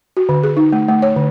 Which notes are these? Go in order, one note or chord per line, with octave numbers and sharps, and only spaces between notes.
F#4
D3
G#4
D#4
A3
A3
C#5
D3